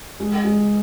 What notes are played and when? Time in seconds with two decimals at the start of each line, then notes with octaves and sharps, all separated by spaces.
0.20 G#3
0.44 G#3